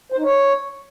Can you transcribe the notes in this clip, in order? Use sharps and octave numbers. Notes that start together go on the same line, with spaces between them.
C5
D#4
C#5